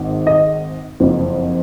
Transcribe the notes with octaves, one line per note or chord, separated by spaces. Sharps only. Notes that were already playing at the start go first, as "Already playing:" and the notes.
Already playing: G#1 G#2 D#3
D#5
F#1 F2 F3